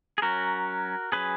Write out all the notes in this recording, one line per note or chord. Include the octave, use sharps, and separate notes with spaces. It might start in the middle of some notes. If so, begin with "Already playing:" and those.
G#4
F#3 C#4 F#4 A#4
F#3 C#4 G#4 B4